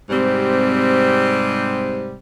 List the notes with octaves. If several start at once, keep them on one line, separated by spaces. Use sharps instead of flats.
G#2 C3 G3 C4 G4